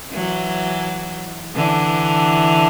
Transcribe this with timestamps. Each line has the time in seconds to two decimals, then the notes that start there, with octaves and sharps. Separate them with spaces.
0.12 E3 F#3
1.56 D3 E3